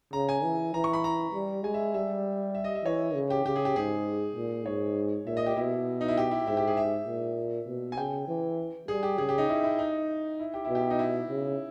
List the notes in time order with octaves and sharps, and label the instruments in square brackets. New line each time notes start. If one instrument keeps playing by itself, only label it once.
[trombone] C#3 [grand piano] A#5
[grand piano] G#5
[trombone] E3
[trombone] E3 [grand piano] A#5
[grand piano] C#6
B5
A#5
[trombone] G3
[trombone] G#3 [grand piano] G#5
[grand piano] E5
[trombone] G3 [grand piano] E5
[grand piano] E5
D#5
E5
[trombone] E3 [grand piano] C#5
[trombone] C#3
[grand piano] G4
[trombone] C#3 [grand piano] G4
[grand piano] G#4
G4
[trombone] G#2 [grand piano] G#4
[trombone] A#2
[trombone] G#2 [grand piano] C#5
[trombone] A#2 [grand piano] E5
[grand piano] D#5
G4
[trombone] B2 [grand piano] E4
[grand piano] D#4
E4
G4
E4
[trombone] G#2 [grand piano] E4
[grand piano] G4
G#4
E5
[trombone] A#2
B2
[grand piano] G#5
[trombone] C#3 [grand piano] G5
[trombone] E3
[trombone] G3 [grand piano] G#4
[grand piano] G4
[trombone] C#3 [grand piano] G#4
[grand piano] G4
D#4
E4
E4
D#4
E4
G4
[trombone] B2 [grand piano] E4
[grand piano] G4
D#4
E4
[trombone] C#3